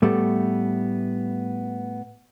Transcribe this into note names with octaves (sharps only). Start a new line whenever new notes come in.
A2 G3 A3 B3